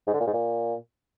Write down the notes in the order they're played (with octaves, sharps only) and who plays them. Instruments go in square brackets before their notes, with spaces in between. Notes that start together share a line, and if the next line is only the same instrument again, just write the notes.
[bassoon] G#2
D3
A#2
G#2
A#2